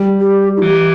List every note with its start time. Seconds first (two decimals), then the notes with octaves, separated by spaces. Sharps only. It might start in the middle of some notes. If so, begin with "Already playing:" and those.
Already playing: G3
0.20 G4
0.57 E4
0.62 E3 G4